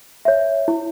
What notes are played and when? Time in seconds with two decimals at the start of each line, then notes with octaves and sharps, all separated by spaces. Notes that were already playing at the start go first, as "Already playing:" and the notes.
0.25 C#5 E5
0.68 E4